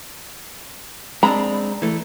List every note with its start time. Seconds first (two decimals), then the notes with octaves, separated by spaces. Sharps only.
1.23 G#3 C4 D4 A#5 B5
1.82 E3 A3